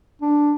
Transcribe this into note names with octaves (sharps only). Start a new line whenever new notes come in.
D4